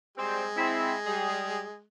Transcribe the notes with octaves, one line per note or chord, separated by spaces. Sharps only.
G3 G#3 C4
C4 E4
G3 G#4